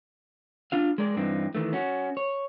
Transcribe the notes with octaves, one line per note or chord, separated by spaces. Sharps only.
D4 F4 F5
G#3 A#4 D5
G2 E3 C4 D#4
D#3 E3 A3
C#4 F#4
C#5